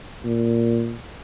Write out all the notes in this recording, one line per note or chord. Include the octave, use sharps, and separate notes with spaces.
A#2